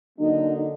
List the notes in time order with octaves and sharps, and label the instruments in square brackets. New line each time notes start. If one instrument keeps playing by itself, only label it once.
[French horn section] D3 F#3 A#3 D#4